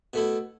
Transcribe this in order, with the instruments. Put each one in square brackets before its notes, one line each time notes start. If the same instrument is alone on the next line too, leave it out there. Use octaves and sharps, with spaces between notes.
[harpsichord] B2 A3 E4